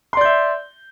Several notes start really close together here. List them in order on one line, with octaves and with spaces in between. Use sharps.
C6 D5 G6 E5